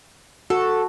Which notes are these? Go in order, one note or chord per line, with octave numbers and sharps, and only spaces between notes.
F#4 A4